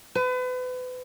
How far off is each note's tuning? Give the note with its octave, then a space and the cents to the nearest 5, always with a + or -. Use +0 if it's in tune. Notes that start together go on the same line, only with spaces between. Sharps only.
B4 +35